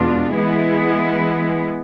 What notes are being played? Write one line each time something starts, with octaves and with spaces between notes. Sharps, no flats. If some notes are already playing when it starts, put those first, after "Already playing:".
Already playing: E2 B2 G#3 D4 F4
E3 G#3 B3 E4 G#4